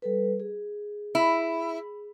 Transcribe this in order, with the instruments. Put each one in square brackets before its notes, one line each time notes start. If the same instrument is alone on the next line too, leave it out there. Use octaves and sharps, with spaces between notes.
[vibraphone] G3 A4 B4
G#4
[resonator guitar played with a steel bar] E4